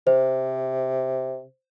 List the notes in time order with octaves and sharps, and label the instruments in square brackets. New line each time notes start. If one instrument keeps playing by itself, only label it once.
[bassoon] C3 [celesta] C5